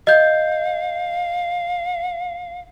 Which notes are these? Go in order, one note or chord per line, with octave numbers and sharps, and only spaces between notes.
D#5 F5 G6